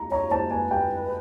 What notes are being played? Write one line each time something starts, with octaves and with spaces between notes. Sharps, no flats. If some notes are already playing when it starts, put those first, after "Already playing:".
Already playing: A#5
C#5 A#5
C5 A5
B4 G#5
G5